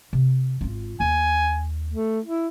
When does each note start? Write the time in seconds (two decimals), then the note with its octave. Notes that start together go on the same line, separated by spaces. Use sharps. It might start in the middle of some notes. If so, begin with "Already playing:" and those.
0.13 C3
0.61 G#1 F4
1.00 D#2 G#5
1.92 A3
2.25 E4